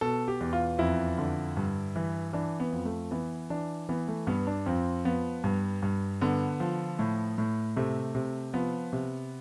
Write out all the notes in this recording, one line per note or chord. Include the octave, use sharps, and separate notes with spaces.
B2 A4
G4
E2
F4
F2 E4
D3
G2
E3
E3 D4
B3
F2
A3
E3 B3
E3 D4
E3 B3
A3
G2 B3
D4
F2 C4
F3 B3
G2
G2
D3 B3
F3
A2
A2
C3 A3
C3
F3 B3
C3